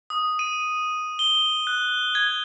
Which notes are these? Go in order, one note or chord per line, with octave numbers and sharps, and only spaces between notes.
D#6
D#7
G7
F#6
G#6